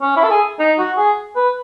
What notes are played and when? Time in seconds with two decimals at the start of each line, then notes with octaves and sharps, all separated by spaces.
0.02 C#4
0.17 E4
0.24 A4
0.30 G#4
0.59 D#4
0.79 F#4
0.97 G#4
1.36 B4